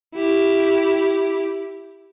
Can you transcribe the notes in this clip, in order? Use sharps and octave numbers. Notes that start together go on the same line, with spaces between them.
E4 G4